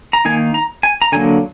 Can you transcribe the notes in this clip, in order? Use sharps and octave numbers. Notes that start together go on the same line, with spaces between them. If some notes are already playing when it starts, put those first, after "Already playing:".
A#5
D#3 A#3 D#4 G#5
A#5
G#5
A#5
D3 F#3 A#3 G#5